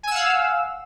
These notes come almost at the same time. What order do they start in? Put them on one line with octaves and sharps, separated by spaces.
G#5 E6 F#5 F5